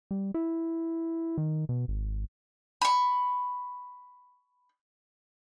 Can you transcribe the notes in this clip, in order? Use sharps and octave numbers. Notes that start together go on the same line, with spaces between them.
G3
E4
D#3
B2
G#1
B5 C#6